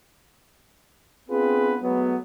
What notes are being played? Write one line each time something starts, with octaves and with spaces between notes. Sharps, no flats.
B3 C4 D4 F4 G#4 B4
F#3 G#3 A3 B3